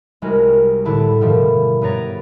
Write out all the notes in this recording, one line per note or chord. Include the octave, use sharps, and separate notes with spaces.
C2 G#3 C#4 F#4 A#4
A2 D3 E4 A5
G2 B2 D#3 F3 A3
G2 B3 C#5 A#5 A6 D7